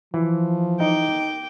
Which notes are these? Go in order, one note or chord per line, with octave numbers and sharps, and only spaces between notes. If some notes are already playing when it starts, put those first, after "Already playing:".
E3 F3
D#4 G5 D6